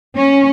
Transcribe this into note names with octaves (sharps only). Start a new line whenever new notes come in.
C#4